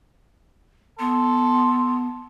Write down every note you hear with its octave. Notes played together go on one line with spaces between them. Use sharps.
B3 A4 C6